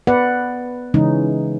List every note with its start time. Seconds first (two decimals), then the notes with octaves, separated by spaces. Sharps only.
0.07 B3 B4 D5 F#5
0.94 C#3 E3 G#3 C#4 D#4